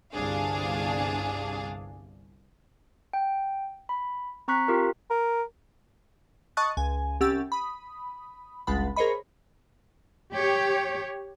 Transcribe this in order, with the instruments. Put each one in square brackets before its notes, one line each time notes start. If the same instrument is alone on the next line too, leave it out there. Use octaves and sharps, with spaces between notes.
[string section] G1 C2 D4 G#4 F5
[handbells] G5
B5
C4 A#5 C#6 F#6 B6
F4 G4 A#4
[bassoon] A#4
[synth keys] D#5 A5 C#6 D#6 F#6 A6
C#2 G#5
C2 C#4 G4 F#5 E6 A6
B5 D#6
G1 C#2 G#3 F#5 B5 A6
G#4 A#4 C5 C#5 D#5 B5
[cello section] G4 C#5